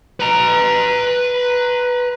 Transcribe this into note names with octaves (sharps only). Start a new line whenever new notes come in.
B4 A#5